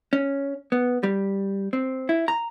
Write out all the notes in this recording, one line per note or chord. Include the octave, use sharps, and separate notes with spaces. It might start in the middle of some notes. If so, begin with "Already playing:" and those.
C#4
B3
G3
C4
E4
A#5